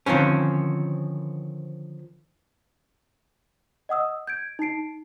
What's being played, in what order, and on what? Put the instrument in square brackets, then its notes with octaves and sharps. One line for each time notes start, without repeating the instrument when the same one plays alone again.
[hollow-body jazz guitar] D3 D#3 F3 C4 C#4
[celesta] D#5 F#5 D#6 E6
G6 G#6 D7
D#4 A5 C7 D7